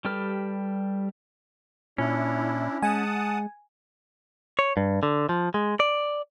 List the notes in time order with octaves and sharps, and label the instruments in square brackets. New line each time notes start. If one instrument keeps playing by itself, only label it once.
[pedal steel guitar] G3 G4 A4 B4 F6
[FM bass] A#2 [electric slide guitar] C#4 [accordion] D4 E4
[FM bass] G#3 [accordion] F#5 A5 D#6 [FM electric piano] G#5
[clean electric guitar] C#5
G2
D3
F3
G#3
D5